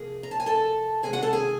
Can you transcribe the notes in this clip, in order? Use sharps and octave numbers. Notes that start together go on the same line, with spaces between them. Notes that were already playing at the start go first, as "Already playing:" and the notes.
Already playing: F2 C3 F3 A#3 G#4
A#5
A5
G#5
A4 A5
C3 D#3 G#3 G#4 G#5
F#4 F#5
A4 A5
G#4 G#5